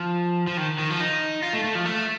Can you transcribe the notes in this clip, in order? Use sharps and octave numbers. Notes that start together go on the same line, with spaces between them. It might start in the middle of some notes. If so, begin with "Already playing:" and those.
Already playing: F3
F3
D#3
D#3
F3
D#4
F4
A3
A3
F3
A3